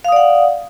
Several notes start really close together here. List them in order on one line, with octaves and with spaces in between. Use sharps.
F5 D#6 D5 F#5